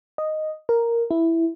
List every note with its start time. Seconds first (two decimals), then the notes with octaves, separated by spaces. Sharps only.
0.18 D#5
0.69 A#4
1.11 E4